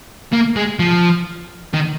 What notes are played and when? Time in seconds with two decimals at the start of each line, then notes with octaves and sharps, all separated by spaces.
0.33 A#3
0.56 G#3
0.79 F3
1.74 D#3